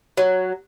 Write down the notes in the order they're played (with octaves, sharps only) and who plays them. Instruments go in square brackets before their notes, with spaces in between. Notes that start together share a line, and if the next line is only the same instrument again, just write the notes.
[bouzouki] F#3